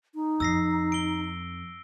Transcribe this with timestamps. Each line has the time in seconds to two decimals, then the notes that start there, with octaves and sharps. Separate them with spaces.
0.15 D#4
0.40 F2 E6 A#6 C7
0.92 D7 G7